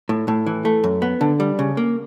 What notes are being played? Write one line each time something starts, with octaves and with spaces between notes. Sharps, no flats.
A2
A2
E3
A3
F#2
B3
D3
G3
C#3
A#3